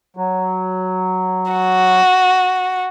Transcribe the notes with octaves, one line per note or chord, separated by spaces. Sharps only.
F#3
F#4